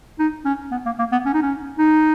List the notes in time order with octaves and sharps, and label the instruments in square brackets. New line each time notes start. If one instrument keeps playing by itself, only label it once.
[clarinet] D#4
C#4
B3
A#3
A#3
B3
C#4
D#4
C#4
D#4